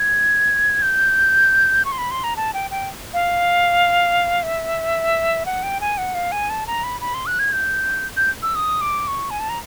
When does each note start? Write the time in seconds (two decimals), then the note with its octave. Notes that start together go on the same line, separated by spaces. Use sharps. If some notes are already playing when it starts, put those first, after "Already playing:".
Already playing: G#6
0.82 G6
1.85 C#6
1.92 C6
1.98 B5
2.11 C6
2.24 A#5
2.37 A5
2.54 G5
2.71 G5
3.14 F5
4.43 E5
5.46 F#5
5.63 G5
5.81 G#5
5.98 F#5
6.15 F5
6.32 G#5
6.50 A5
6.67 A#5
6.83 B5
7.01 B5
7.14 C6
7.26 F#6
7.39 G#6
7.52 G6
8.17 G6
8.42 E6
8.55 D#6
8.81 D6
9.08 C#6
9.30 G#5
9.40 A5
9.49 A#5